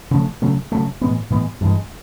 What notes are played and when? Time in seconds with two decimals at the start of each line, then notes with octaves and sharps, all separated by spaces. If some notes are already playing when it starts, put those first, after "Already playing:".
0.11 C#3 F3 A3
0.42 C#3 F#3 A3
0.72 C#3 F#3 A3
1.01 A2 E3 G#3 B3
1.30 A2 E3 G#3 B3
1.61 G2 E3 G#3